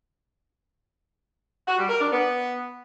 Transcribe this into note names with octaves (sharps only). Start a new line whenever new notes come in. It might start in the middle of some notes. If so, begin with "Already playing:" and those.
F#4
G3
A#4
D4
B3